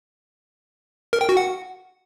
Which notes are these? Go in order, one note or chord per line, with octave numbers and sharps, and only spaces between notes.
A#4
G5
F#4
F#5